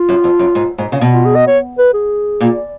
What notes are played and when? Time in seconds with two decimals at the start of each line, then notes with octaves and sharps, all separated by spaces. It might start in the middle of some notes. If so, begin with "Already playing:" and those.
Already playing: F4
0.09 F#2
0.24 F2
0.39 F#2
0.55 G#2
0.78 G#2
0.92 C#3
1.01 B2
1.14 F4
1.25 G#4
1.36 D#5
1.48 C#5
1.79 B4
1.94 G#4
2.41 A#2